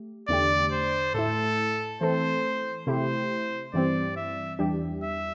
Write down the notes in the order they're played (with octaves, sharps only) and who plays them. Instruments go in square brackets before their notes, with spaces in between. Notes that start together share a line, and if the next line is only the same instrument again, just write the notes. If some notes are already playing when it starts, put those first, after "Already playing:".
Already playing: [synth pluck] A3 G4
[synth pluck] E2 D3 A3 D4 G4 [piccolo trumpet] D5
[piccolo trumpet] C5
[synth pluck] A2 A3 E4 [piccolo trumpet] A4
[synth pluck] E3 A3 C4 A4 [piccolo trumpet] C5
[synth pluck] C3 A3 E4 G4 [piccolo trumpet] C5
[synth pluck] G2 E3 G3 C4 [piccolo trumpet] D5
[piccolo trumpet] E5
[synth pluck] E2 E3 G3 D4 G4
[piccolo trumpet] E5